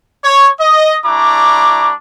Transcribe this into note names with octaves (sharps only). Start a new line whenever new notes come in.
C#5
D#5
G3 D4 E4 A#5 C#6 D6